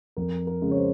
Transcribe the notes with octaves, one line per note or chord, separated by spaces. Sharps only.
F2 A#4
A#4
C#3 G#3
C#5
C5